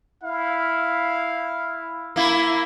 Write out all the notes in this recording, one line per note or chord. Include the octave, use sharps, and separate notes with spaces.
E4 F5
A#3 E4